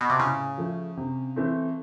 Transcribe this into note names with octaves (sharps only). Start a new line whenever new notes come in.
B2
C3
A2 C#3
F3 A3
C3
E3 A3 C4